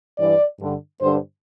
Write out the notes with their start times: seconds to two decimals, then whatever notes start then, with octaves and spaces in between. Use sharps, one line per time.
0.18 G2 E3 D5
0.60 G2 D3
1.01 G2 D3 C5